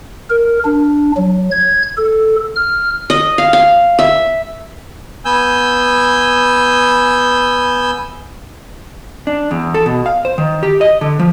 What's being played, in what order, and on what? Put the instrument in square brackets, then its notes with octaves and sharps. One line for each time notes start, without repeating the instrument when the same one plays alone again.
[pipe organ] A#4
D4
F#3
G#6
A4
F6
[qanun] D#5
F5
F5
E5
[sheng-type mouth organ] B3 G#5 E6 G6
[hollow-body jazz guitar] D4
E2
A4
B2
F5
C5
D#3
G4
D#5
D3
F3